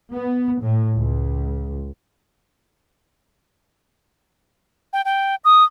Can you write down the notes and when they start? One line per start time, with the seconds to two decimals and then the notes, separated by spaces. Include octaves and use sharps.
0.13 B3
0.61 A2
0.96 C#2
4.93 G5
5.05 G5
5.45 D#6